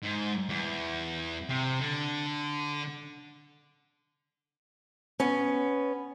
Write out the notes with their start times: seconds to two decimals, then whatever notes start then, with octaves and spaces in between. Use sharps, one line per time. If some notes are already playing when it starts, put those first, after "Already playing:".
0.03 G#2
0.49 E2
1.49 C3
1.80 D3
5.20 B3 C#4